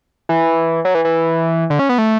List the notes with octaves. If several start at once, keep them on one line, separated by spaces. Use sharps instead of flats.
E3
F#3
E3
E3
D3
C#4
B3
A3